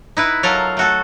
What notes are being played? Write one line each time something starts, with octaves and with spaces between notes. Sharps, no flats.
D#4 E4 B4
F#3 F4 A4 A#4 F5
A3 F#4 A4